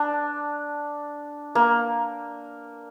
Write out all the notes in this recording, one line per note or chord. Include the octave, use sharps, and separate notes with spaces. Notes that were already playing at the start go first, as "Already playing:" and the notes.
Already playing: D4
A#3